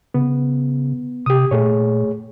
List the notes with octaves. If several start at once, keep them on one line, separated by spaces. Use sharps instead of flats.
C#3 B3
C3 G4 D#6
A#2 A3 G#4 C#5